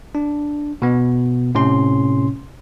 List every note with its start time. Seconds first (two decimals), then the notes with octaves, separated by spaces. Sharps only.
0.15 D4
0.82 B2 B3
1.55 A2 C3 C#4 C6